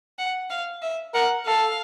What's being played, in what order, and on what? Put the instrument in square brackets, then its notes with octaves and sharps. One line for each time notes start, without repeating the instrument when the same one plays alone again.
[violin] F#5
F5
E5
[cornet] A#4 [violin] F#5
[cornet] A4 [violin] F5